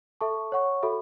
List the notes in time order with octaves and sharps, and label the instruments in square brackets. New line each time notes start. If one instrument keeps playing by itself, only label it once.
[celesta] A4 E5 A5 C#6
C#5 F#5 C#6
F#4 A4 E5 B5